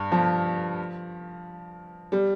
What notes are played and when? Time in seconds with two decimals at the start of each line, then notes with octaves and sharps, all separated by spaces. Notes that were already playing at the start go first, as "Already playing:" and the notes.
Already playing: G2
0.12 F3
2.12 G3